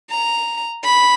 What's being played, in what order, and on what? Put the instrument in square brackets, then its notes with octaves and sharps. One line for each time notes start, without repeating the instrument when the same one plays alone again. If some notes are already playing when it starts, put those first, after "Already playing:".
[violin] A#5
B5